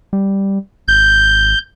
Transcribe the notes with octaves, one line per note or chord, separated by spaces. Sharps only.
G3
G#1 G6